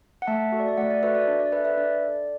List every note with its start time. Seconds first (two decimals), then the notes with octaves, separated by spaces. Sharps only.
0.22 F#5
0.27 A3 E5 A5
0.52 F#4 A4
0.60 D5
0.68 E5
0.77 A3 D5 F#5
0.91 D5
1.03 F#4 A4 B4 E5
1.15 D5
1.28 D4
1.40 D5
1.52 A4 B4 E5
1.64 B4 E5
1.77 D4 D5
2.03 A4